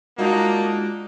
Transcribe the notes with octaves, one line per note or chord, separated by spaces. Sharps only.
G#3 A#3 D4 D#4 F4 F#4